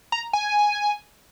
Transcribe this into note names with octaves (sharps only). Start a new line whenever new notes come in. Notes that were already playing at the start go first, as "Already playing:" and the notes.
A#5
G#5